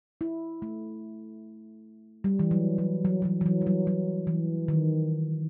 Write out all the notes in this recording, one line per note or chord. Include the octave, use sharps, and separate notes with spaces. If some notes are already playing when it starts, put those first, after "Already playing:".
E4
A3
G3
E3
F#3
F#3
F#3
F#3
E3
E3
F#3
G3
F#3
F#3
E3
D#3